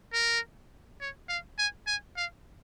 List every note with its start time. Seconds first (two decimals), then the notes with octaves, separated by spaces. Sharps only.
0.13 A#4
1.01 C#5
1.29 F5
1.58 G#5
1.87 G#5
2.17 F5